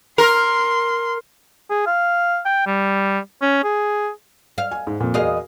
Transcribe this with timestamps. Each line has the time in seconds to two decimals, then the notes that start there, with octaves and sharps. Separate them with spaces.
0.18 A#4 C6
1.70 G#4
1.86 F5
2.45 G5
2.67 G3
3.42 C#4
3.64 G#4
4.58 F5
4.71 G#5
4.87 G#2
5.00 F2 A#2
5.14 E2 F#4 G#4 A#4 D#5 F5